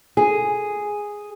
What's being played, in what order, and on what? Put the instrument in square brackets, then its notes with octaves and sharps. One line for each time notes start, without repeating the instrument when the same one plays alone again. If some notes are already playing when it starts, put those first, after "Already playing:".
[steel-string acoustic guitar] G#4